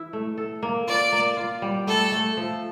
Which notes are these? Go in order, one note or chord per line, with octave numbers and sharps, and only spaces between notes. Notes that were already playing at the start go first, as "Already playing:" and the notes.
Already playing: E3 E4
A3
A4
A#3
F4 D5
A#3
F4
G3
A3 A4
A3
F3